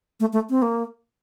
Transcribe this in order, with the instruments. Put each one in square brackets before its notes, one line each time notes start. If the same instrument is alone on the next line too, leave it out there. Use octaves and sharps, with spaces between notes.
[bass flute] A3
A3
C4
A#3